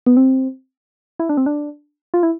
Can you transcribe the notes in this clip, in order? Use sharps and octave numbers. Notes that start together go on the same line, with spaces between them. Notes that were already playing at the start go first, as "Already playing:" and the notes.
B3
C4
E4
D4
C4
D4
F4
E4